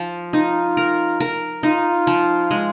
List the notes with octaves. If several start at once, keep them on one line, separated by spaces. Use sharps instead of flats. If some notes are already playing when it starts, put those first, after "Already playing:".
Already playing: F3
D#4 F4
A#4
A#4
D#4 F4
F3
G#3